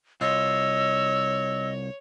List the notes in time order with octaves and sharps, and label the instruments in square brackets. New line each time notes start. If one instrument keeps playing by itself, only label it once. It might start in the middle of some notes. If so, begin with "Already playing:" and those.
[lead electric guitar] C2 F4 [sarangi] C#5 [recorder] D#5 [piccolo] E6